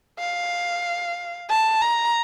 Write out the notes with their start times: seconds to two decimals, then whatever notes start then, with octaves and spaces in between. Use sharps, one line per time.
0.19 F5
1.49 A5
1.81 A#5